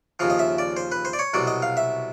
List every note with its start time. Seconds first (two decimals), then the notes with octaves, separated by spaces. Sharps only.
0.19 D#2 C#3 F3 F5
0.30 D#5
0.39 E5
0.58 D5
0.77 C5
0.92 B4
1.05 C5
1.13 D5
1.19 C#5
1.34 C2 B2 F#3 D5
1.47 D#5
1.62 F5
1.77 E5